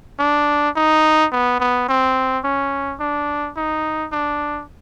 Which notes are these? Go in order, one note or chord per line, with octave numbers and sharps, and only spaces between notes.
D4
D#4
B3
B3
C4
C#4
D4
D#4
D4